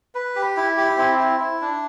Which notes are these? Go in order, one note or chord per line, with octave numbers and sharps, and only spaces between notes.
B4
G4
E4
G4
C4 E4
E4
E4
D4